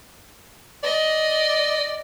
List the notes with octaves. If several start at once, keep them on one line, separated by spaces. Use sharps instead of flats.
D5 D#5